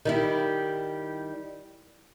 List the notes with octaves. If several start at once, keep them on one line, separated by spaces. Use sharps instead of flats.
D#3 G3 E4